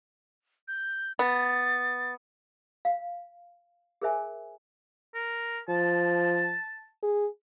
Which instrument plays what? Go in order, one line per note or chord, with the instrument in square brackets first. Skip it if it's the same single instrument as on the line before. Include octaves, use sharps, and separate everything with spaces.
[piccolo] G6
[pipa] B3 [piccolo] A6
[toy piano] F5
G#4 A#4 C5 E5 G#5
[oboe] A#4
[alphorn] F3 [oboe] A5
[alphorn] G#4